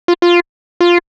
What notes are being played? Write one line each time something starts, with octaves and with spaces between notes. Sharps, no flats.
F4
F4
F4